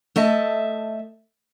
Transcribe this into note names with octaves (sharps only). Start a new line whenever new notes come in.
A3 D#5 E5 A5